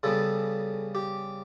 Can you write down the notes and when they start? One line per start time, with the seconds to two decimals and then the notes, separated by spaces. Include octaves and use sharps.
0.03 C#3 G3 B3 A4
0.95 G4